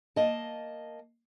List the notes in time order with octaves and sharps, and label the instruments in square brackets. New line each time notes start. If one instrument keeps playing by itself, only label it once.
[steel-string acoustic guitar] A#3 D#5 A5